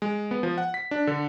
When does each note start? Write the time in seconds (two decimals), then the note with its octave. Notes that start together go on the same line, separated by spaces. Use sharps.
0.02 G#3
0.31 B3
0.43 F3
0.58 F#5
0.74 B6
0.91 D4
1.07 D3